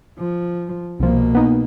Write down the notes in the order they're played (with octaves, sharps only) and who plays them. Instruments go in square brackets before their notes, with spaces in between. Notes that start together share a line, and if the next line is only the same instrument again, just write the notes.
[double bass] F3
[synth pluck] C2 F3 [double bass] B2 A#3
[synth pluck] B3 D#4